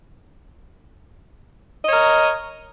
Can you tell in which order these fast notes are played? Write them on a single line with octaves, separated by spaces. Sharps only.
D#5 C#5 A#4